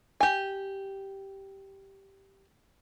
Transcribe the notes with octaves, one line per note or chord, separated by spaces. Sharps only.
G4 G#5